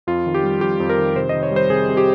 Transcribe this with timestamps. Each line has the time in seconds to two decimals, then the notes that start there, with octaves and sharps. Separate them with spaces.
0.07 F2 F4
0.26 D#3
0.35 G4
0.43 G3
0.61 F2 G4
0.80 F2
0.89 A#4
0.98 D#3
1.16 C3 C5
1.29 D#3 D#5
1.43 C#5
1.51 G3 C5
1.70 C3 G#4
1.89 C3
1.97 G4